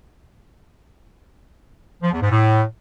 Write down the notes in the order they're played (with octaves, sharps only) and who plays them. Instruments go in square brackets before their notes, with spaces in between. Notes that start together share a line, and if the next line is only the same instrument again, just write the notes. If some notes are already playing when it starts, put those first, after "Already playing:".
[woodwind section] F3
E2
G#2
A2